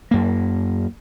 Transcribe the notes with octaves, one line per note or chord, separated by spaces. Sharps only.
F#2 A#3